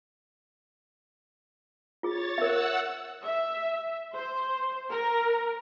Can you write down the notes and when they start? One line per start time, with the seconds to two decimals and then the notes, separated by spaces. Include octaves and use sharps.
2.03 F4 G#4 C#5 A6
2.38 A#4 E5 F#5 E6
3.25 E5
4.14 C5
4.90 A#4